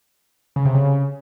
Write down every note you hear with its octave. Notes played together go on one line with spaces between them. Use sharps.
C#3
C3
C#3